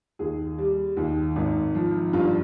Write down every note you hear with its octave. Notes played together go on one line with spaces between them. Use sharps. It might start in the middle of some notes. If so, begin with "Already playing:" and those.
D#2 G#4
G3
D#2
G#1
F3
G2 F4